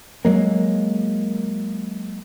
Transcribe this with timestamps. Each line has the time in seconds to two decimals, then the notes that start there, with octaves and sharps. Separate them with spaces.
0.25 F#3 G#3 A#3